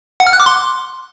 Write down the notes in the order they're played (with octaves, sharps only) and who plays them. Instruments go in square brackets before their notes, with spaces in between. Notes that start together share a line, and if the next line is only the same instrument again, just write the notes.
[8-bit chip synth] F#5
F6
F#6
D6
C6